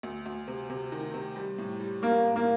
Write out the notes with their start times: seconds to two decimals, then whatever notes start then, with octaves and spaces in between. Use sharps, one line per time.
0.03 D2
0.26 D2
0.48 C3
0.70 C3
0.92 D#3
1.14 C3
1.36 G3
1.58 A2
1.80 G3
2.02 G3 A#3
2.24 A2
2.36 A#3